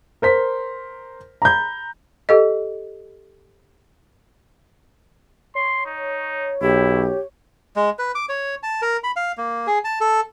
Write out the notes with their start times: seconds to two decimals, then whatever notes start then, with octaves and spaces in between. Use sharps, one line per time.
0.22 A#4 C5 B6
1.42 A#5 B5 G6
2.29 G4 A4 D#5
5.55 C#5 C6
5.85 D#4
6.62 B1 E4 G4
7.76 G#3
7.99 B4
8.15 D6
8.29 C#5
8.63 A5
8.82 A#4
9.04 B5
9.16 F5
9.37 A#3
9.67 G#4
9.84 A5
10.01 A4